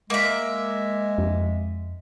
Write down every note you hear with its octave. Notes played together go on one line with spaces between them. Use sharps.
G#3 A#3 E5
F2